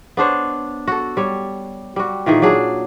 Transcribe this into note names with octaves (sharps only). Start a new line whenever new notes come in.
B3 D4 C5 C#5
F#4 A4
G3 C#5
G3 F#4
A#2 D#3 E3 G#4
F#3 D4 G#4